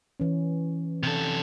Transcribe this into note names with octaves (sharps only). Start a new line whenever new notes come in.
E3 C#4
C3 A4